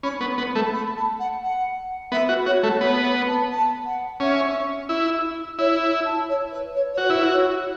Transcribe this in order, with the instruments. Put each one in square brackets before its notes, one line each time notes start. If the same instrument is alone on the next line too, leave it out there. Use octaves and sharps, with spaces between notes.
[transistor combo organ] C#4 [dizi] B5
[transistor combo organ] B3
B3
A3
[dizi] B5
A5
F#5
F#5
[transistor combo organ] B3 [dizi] E5
[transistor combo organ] F#4
[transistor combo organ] F#4 [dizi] C#5
[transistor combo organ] A3
[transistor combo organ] B3 [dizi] C#5
[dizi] A5
A5
F#5
[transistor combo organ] C#4 [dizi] E5
[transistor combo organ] E4
[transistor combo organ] E4 [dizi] C#5
[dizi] A5
C#5
B4
C#5
C#5
[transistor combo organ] F#4 [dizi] B4
[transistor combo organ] E4
F#4
[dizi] C#5